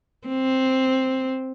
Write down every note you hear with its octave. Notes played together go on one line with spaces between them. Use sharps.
C4